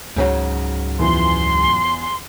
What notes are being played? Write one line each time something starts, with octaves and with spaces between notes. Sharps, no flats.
C#2 G#2 C#3 F#3
E2 E3 F3 C6